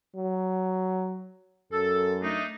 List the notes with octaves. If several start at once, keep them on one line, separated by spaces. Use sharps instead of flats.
F#3
F#2 A4
A3 D4 D#4